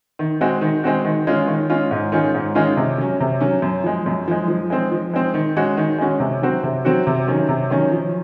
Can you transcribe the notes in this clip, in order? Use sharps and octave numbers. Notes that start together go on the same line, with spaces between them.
D#3
G#3 C4 F#4
D#3
G#3 C4 F#4
D#3
G#3 C#4 F4
D#3
G#3 C#4 F4
G#2
D#3 G#3 C#4 F4
G#2
D#3 G#3 C#4 F4
C3
F#3 C#4
C3
F#3 C#4
F#2
F3 G#3
F#2
F3 G#3
F3
G#3 C4
F3
G#3 C4
D#3
G#3 C#4 F#4
D#3
G#3 C#4 F#4
C3
F#3 C4 F#4
C3
F#3 C4 F#4
C3
D#3 F#3 C#4
C3
D#3 F#3 C#4
F3